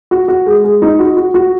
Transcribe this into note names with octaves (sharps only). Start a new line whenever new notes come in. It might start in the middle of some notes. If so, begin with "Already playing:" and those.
F#4
F#4
G#3
G#3
D#4
F#4
F#4
F#4